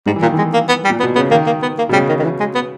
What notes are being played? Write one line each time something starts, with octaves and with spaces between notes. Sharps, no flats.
G#2 G3
E3
A#2 D#3
E3 G#3
A#3
B3
G3
A#2
B3
B2
C#3 B3
D#3 A#3
A#3
B3
A#3
B2
C#3 G3
D#3
D#3
E3
G#3
B3